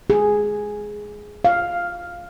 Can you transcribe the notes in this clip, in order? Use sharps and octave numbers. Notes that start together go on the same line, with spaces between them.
G#4
F5